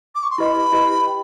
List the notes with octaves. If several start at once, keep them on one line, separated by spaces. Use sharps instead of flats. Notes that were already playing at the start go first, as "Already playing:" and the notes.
D6
C#6
C6
E4 G4 B4 D#5 B5
E4 G4 B4 D#5
G5